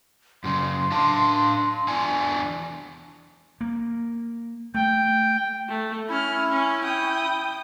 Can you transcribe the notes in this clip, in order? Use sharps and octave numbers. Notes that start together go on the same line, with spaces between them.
F#2 C#3 C6
D4 F5 A5
E2 D4 G#5
A#3
A3 G5
A3
C#4 E4 F6
C#4
G5 D#6